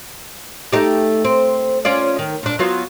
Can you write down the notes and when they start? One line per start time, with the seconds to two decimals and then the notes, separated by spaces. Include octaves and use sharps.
0.73 A3 D#4 G4
1.25 C4
1.85 C#4 F4 D5
2.19 D#3
2.43 A#2 D4
2.59 F#3 B3 F4